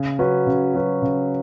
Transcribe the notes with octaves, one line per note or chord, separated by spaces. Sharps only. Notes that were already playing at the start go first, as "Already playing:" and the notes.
Already playing: C#3
F#3 C#4 F#4 B4
C#3
F#3 C#4 F#4 B4
C#3